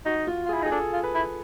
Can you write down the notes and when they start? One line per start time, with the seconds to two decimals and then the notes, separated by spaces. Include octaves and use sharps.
0.06 D#4 F#4
0.27 F4
0.45 F4 G#4
0.54 E4
0.62 D#4 G#4
0.71 D4 A4
0.93 F4
1.03 B4
1.15 E4